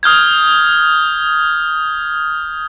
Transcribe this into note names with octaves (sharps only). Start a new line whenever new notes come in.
D#6 F6 G6 G#6